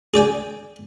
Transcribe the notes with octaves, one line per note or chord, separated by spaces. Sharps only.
G#4 D5 G5 G#5